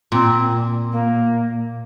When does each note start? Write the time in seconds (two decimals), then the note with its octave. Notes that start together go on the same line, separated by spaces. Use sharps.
0.12 A#2 C4
0.92 A#3